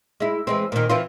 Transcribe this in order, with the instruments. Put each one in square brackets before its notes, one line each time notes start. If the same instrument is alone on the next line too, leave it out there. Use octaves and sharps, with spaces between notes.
[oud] G#3 E4
E3 G#3 C4
A#2 D#3
E3 C4 F4